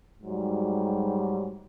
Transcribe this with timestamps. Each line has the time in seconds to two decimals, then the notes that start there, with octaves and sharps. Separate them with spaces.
0.22 G#2 F#3 G3